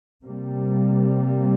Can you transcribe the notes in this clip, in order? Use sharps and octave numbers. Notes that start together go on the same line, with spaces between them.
C3 G3 A#3